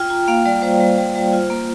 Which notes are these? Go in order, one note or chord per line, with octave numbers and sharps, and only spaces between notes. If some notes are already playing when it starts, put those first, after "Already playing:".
Already playing: F4 G5
F4 A#5
A#3 F5
G3 D5
G3 C5
G3
G3
G3
F4
A#3